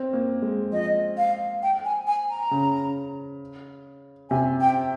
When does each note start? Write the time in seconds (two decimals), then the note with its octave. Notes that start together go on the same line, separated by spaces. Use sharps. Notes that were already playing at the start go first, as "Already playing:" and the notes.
Already playing: C4
0.13 A#3
0.42 G#3
0.72 F3 D#5
1.17 F5
1.62 G5
1.84 G#5
2.07 G#5
2.30 A#5
2.51 C#3
4.30 C3 G#5
4.60 G5